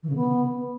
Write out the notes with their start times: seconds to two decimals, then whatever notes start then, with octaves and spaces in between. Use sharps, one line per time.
0.02 E3
0.09 C#3
0.15 B3